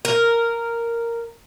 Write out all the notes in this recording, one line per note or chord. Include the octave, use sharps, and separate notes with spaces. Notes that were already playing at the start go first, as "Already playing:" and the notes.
A#4